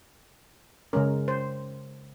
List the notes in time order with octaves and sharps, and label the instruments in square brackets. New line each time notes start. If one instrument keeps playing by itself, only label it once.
[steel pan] C#3 G#3 C#4 A#4
C5